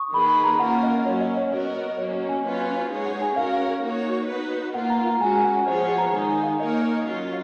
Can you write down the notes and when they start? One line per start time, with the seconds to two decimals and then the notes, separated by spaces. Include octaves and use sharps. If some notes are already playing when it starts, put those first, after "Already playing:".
Already playing: C#6 D#6
0.13 D#3 A#3 D#4 G#4 B4 B5
0.28 B5
0.44 A#5
0.59 A#3 C#4 F4 A#4 F#5
0.83 D#5
1.06 F#3 A#3 C#4 C#5
1.20 D#5
1.37 C#5
1.52 B3 F#4 A#4 D#5
1.74 D#5
1.98 F#3 A#3 C#4 C#5
2.13 C#5
2.29 G#5
2.44 F#3 C#4 F4 B4
2.59 G#5
2.74 F5
2.91 G#3 D#4 G#4 C#5
3.06 F#5
3.22 G#5
3.36 C#4 F#4 A#4 C#5 F5
3.52 F5
3.66 F5
3.83 A#3 D#4 F#4 C#5
4.28 B3 D#4 F#4 B4
4.74 A#3 F4 A#4 F#5
4.90 A#5
5.06 A#5
5.21 G#3 C#4 F#4 G#5
5.36 G#5
5.44 F#5
5.66 F3 B3 F4 G#4 C#5 D#5
5.82 F#5
5.98 A#5
6.12 D#3 G#3 D#4 G#5
6.29 G#5
6.43 F5
6.59 A#3 D#4 A#4 C#5 D#5
6.82 D#5
7.05 F#3 C#4 F4